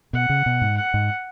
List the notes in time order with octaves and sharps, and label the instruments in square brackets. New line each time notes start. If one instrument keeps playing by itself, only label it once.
[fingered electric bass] B2 [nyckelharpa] F#5
[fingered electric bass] C#3
B2
G#2
[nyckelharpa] F#5
[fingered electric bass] G#2